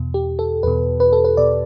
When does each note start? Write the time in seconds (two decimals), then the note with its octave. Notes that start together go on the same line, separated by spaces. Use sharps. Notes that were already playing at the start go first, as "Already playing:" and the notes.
Already playing: E2 B2
0.14 G4
0.39 A4
0.63 E2 B2 B4
1.00 B4
1.13 A4
1.25 B4
1.37 B2 D5